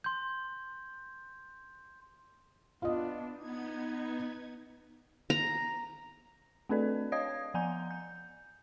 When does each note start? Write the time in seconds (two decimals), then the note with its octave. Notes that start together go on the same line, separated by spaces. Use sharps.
0.04 C6 G6
2.82 B3 D4 F4 D#5
3.38 B3 D#4 G#6
5.30 A#5
6.69 A3 C4 D4 A4 B4 D5
7.12 C#5 D#5 F5 D#6 G#6
7.54 F3 F#5 G#5 A#5 G6
7.91 G6